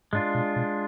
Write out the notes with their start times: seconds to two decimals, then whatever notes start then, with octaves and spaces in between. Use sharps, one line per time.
0.13 G#2 G#3 D4 F4
0.35 B2
0.56 B2